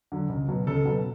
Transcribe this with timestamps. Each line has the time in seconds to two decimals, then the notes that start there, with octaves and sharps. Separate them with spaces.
0.12 D3 F#3
0.29 C#2
0.48 B2 F#3
0.67 C#2 A4
0.85 B2 F#3